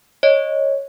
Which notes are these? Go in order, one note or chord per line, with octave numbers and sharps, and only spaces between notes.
C#5 D#5